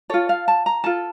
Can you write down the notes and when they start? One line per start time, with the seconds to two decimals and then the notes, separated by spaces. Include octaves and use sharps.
0.10 F4 A4 C#5
0.29 F5
0.48 A5
0.66 A#5
0.84 F4 A4 A5